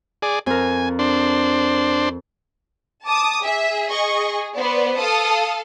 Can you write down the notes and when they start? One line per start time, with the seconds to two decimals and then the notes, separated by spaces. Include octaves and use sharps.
0.22 G#4 D5
0.46 F2 A#4 G#5
0.99 D4 C5
3.05 A5 D6 D#6
3.43 G#4 E5
3.89 D#5 C#6
4.56 B3 B4 C5 D5
4.99 A4 F5 A5 D#6